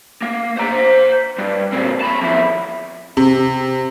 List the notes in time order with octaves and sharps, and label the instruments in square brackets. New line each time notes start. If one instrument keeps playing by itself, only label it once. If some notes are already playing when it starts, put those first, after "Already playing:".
[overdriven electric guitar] A#3
C5 A#5
G2
A#2 C4
A5 B5
F2 E4
[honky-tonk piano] C3